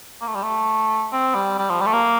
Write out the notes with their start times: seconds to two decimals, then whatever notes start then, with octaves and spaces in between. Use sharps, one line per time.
0.21 A#3
0.27 A3
0.35 G3
0.43 A3
1.13 C4
1.35 G3
1.59 G3
1.70 F3
1.81 G3
1.86 A3
1.93 A#3